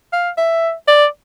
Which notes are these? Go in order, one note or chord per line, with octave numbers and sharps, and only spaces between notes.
F5
E5
D5